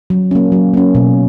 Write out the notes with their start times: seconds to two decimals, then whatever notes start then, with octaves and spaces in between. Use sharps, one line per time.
0.10 F#3
0.31 A#3 C#4
0.52 F#3
0.74 A#3 C#4
0.95 B2